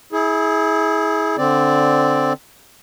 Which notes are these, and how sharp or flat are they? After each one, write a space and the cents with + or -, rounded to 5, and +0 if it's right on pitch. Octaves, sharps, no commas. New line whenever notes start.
E4 -30 G#4 +15
D3 +0 C4 +0 D5 +0